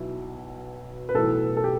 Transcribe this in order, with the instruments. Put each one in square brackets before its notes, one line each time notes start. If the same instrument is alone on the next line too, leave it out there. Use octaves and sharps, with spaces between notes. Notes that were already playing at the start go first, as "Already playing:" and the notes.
Already playing: [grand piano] B1 B2 E4
B4
B1 A2 E3 A4
A4
G4